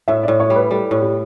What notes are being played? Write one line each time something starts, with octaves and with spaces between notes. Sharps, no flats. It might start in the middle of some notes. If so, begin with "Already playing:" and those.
A2 E5
A2 D5
C#5
G3
B4
G3 A4
A2
G4